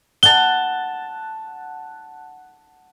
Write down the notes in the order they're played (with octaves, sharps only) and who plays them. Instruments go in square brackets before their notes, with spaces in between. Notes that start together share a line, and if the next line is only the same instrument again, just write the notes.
[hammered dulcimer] F#5 A5 [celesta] G7